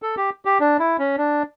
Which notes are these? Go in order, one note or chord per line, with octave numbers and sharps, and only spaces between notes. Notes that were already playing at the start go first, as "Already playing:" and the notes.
A4
G4
G4
D4
E4
C#4
D4